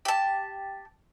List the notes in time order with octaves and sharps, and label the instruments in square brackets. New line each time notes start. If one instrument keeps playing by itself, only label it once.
[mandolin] G4 A5